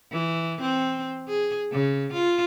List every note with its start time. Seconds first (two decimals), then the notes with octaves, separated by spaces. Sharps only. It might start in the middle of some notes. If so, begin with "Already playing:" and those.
0.12 E3
0.61 C4
1.28 G#4
1.72 C#3
2.13 F4